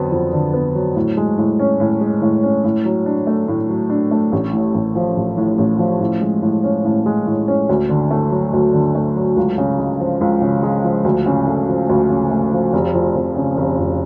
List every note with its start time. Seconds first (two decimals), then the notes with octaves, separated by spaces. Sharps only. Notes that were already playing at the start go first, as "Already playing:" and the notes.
Already playing: F2 D3 F#3 B3
0.12 F2
0.33 D3
0.54 B3
0.75 F#3
0.96 A2
1.17 G#3
1.38 A2
1.59 C#4
1.80 A2
2.01 G#3
2.22 A2
2.43 C#4
2.64 A2
2.85 F#3
3.06 D4
3.27 A3
3.48 A2
3.69 F#3
3.90 D4
4.11 A3
4.32 A1
4.53 A2
4.74 A1
4.95 F3
5.16 A1
5.38 A2
5.58 A1
5.79 F3
6.01 A2
6.21 G#3
6.42 A2
6.64 C#4
6.85 A2
7.06 G#3
7.26 A2
7.48 C#4
7.69 D2
7.89 D3
8.11 A3
8.31 F#3
8.53 D2
8.73 D3
8.95 A3
9.16 F#3
9.37 C#2
9.58 C#3
9.79 G#3
10.00 F3
10.21 C#2
10.41 C#3
10.63 G#3
10.84 F3
11.05 D2
11.26 C#3
11.47 A3
11.68 F3
11.89 D2
12.10 C#3
12.31 A3
12.52 F3
12.73 F1
12.94 F2
13.16 F1
13.36 C#3
13.57 F1
13.78 F2